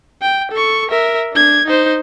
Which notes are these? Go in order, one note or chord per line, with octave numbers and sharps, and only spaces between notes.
G5
A4 C#6
A#4 E5
D4 G#6
D#4 C5